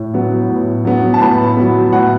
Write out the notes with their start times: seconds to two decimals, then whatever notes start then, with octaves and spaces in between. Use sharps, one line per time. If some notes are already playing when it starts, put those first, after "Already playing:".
Already playing: A2
0.14 F#3 B3
0.49 A2
0.85 F#3 B3
1.14 A5
1.21 A2 B4 B5
1.57 F#3 B3
1.92 A2 F#5